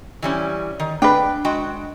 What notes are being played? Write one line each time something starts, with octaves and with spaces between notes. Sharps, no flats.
E3 G3 C#4
D#3
D4 B4 G5
G#3 F#4 G5